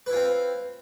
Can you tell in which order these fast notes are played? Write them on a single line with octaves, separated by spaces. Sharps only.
B4 E4 F4 C4